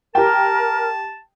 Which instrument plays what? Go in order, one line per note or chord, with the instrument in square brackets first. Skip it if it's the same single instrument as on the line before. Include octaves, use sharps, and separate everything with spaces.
[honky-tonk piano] G4 G5 [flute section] A#4 [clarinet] A5